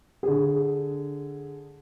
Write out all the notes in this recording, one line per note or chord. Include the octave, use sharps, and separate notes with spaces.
D3 G#4